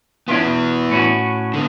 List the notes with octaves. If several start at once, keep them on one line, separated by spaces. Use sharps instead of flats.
B3 C#4 D4 E4 F4
B2
A2 C#4 F#4
D3 B3